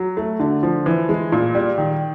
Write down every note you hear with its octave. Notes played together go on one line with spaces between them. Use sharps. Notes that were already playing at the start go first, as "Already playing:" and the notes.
Already playing: F#3
A3
D3
F3
E3
G#3
A#2
G3
D#3